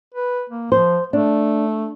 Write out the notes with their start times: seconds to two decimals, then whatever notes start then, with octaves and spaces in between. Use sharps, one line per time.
0.15 B4
0.50 A#3
0.72 F3 C5
1.13 A3 D4